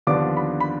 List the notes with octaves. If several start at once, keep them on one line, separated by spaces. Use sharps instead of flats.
D#2 D3 F3 B3 D4 D6
B5
B5